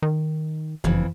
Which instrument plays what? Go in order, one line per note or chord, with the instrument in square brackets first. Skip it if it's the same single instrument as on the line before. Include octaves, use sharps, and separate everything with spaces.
[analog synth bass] D#3
[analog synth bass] F#1 [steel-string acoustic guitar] F2 E3